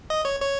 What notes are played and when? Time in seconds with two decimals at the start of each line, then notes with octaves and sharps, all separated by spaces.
0.10 D#5
0.25 C#5
0.41 C#5